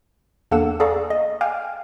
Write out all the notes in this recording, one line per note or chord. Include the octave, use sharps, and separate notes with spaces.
E2 A#3 D4 A4 F#5 E7
G#4 A4 D5 F5 A#5 C#6
D#5
F5 G5 G#5 D6 F6